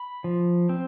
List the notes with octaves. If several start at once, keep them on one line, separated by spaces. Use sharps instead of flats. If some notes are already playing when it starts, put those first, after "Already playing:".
Already playing: B5
F3
C4